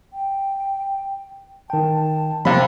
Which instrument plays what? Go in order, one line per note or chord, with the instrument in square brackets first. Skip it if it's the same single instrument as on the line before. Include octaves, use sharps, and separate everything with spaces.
[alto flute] G5
[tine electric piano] D#3 G5 [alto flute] A5
[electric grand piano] C3 B5 [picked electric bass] F3 A#3 C4